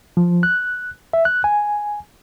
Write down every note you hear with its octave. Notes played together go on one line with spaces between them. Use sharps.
F3
F#6
E5
F#6
G#5